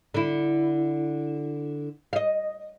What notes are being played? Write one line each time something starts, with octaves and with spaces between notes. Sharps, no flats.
D3 E4
D#5 F5